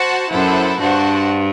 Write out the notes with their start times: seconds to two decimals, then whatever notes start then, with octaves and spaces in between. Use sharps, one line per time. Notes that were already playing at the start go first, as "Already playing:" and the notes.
Already playing: F#4 C5 F#5 A5
0.32 F#2 E4 A4 C5 F#5
0.81 G2 D4 F#4 C5 F#5 A5